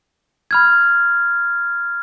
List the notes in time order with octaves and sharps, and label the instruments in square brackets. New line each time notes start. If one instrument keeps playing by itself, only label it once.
[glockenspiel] B5 F6 G#6